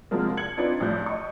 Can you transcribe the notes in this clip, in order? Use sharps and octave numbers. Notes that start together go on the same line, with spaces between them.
C3 F3 F#3 G#3 A#3
G#6 C#7 F#7
C4 D4 D#4 F4 B4
A1 F3 G3 F#6 G6
D#5 C#6